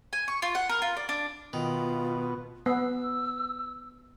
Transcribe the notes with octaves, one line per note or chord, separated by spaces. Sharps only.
G#5
C#6
F4
F#5
A#4
F4
D5
D4
B2 D#3 F4
B3 E6